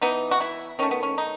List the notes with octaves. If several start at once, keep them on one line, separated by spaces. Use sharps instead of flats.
E3 B3 D#4
F#4
E4
D#3 A3 C#4
B3
C#4
D#4